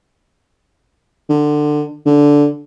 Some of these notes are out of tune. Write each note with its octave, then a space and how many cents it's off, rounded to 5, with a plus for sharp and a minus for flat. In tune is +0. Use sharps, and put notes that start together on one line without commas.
D3 +20
D3 -10